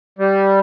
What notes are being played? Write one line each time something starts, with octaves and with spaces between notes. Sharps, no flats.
G3